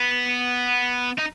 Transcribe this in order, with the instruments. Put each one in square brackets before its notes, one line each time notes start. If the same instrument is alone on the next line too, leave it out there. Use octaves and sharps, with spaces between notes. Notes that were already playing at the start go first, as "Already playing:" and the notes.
Already playing: [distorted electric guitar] B3
D#4